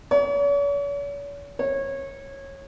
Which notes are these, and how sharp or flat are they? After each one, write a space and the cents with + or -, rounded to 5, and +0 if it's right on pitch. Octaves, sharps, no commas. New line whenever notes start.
C#5 +45
C#5 -20